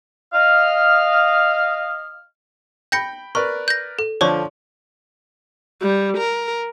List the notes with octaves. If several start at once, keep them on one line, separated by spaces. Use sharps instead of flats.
D#5 F5 F6
G5 B5 G6 A#6 C#7
A#4 B4 D5 C#6
G6 A#6
A4
D3 F3 C#5 D5 C#6
G3
A#4